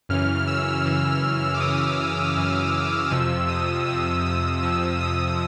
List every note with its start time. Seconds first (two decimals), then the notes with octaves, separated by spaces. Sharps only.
0.09 F#2 C#3 E3 F6
0.36 F6
0.47 E6
0.85 F#2 C#3 E3
1.54 D6
1.60 F#2 C#3 E3 D#6
2.36 F#2 C#3 E3
3.11 F2 C3 F3 E6
3.49 D#6
3.87 F2 C3 F3 E6
4.25 D#6
4.63 F2 C3 F3 E6
4.91 E6
5.01 D#6